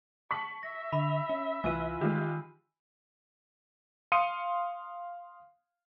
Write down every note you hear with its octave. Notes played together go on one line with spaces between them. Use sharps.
A5 C#6 B6 F#7
E5 A#6
D3 B5
C#4
C2 E3 F4 B4 G#5 E6 D#7
D#3 G#3 F4 G4
F5 C6 D#6 C#7 D#7